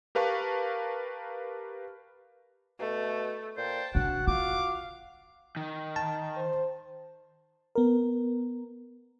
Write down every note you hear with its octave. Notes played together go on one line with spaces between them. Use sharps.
G4 A#4 B4 F5 A5 C#6
B2 A3
A#2 C5 G5 A5
C3 D4 F#4 F#5
F4 F5 D6
D#3
A5
C5
B3 A#4